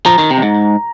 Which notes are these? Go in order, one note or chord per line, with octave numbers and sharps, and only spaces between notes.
F3 A#5
D#3
C3
F2
G#2